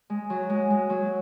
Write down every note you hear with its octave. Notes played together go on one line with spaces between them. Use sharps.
G#3
F#3
G#3
G#3
F#3